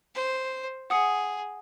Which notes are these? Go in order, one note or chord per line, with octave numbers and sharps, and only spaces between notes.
C5
G#4 F#5 D#6 C#7